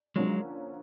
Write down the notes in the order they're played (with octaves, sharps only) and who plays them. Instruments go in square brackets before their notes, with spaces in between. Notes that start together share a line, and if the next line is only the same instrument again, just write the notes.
[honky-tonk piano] D3 F3 A#3 C#4 [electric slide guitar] F#3 G#3